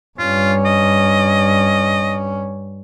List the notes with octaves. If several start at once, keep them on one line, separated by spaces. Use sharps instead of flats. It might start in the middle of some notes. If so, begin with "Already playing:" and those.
G2 C#4 F4
D#5